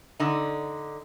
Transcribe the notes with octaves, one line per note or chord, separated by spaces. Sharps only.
D3 D#4